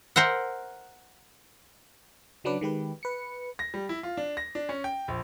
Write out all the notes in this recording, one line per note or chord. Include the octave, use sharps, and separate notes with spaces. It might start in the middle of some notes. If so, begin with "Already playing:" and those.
A#4 C5 E5 F#5
C#3 F#3 D4 B4 D6
D#3 G#3 G4 B4
B4 C#7
A#6
G3
E4
F4
D4
A#6
D4
C#4
G5
A#1